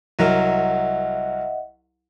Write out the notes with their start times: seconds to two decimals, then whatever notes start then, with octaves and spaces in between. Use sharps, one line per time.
0.19 C2 F#3 A#4 D#5 E5 F#5